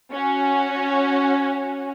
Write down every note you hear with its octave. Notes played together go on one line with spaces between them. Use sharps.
C#4 F#4